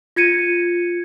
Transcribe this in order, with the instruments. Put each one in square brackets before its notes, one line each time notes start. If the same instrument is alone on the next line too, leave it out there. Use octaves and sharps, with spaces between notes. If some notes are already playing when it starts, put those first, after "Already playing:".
[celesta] F4 G#6 C#7 D#7